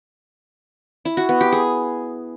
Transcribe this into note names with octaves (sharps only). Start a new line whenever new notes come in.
E4
F#4
B3
G4
G#4